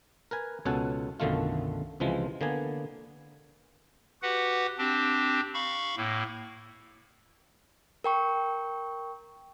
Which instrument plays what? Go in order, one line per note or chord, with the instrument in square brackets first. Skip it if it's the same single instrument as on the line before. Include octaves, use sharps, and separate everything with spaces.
[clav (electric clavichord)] A#4 B4 G#5
C#2 B2 C#4 G#4 A4 F#5
B1 F#2 D3 D#3 A3 F4
C#2 C3 E3 F3 G#3
D3 A#3 B3 G#5
[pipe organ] F#4 G4 B4 F#5
C4 D4 G4
F5 B5 C#6
A2 A#3
[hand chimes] A#4 G5 C#6